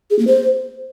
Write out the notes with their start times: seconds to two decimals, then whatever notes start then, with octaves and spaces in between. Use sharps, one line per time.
0.10 G#4
0.19 A#3
0.27 C5